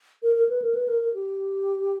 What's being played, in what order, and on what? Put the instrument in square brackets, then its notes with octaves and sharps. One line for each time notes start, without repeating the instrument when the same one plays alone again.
[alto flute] A#4
A#4
B4
A#4
B4
A#4
A#4
G4